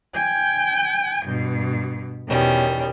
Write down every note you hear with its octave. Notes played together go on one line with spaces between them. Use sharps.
G5 G#5 G6
G2 B2
E2 B2 D#3 G3 C#4